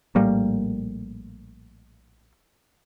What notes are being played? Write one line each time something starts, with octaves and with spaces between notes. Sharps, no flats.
A#1 A2 G3 A#3